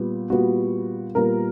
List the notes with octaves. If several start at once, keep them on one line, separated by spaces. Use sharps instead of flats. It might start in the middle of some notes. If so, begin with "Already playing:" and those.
Already playing: A#2 G3 B3
A#2 G3 B3 F#4
A#2 G3 B3 A#4